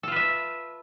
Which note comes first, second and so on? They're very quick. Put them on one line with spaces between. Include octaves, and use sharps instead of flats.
A4 F4 B4 E5